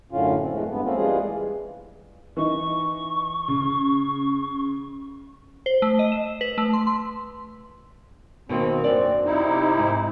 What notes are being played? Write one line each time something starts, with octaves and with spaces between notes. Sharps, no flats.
F#2 A2 D3 C#4 F4
C4
F#2 E3 G#3 A3
G2 B3
A3 A#3 C4 C#4 F4
E3 G3 G#3 F4 G#4
E3 D#4 C#6
C#3
C5
A3
D#5
E7
B4
A3
C6
C6
B2 D#3 A#3 C4
F#2 D4 D5
C3 D#4 E4
G#2